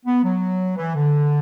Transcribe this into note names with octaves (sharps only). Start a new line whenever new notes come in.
B3
F#3
E3
D3